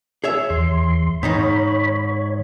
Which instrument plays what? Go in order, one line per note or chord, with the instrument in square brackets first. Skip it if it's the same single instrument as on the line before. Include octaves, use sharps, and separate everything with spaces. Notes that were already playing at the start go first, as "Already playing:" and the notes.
[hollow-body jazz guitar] G#4 C#5 E5
[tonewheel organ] E2 C6
[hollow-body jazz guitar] G#2 D#3 D#4 [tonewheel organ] C#5 B5
[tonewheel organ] C#5